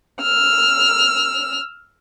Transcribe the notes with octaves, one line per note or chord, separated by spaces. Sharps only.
E6 F6